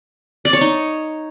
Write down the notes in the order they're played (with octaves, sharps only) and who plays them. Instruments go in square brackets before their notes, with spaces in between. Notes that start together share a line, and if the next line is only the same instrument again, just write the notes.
[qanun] D5
C#5
D#4